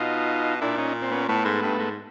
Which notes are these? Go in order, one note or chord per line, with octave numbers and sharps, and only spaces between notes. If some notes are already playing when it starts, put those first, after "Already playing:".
Already playing: B2 D#4 F4
A#2 D4 E4
C#4 D#4
C4
B3 C#4
A2 A3 B3
G#2
G2
G#2